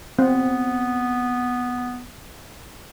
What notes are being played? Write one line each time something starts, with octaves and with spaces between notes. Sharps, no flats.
B3 C4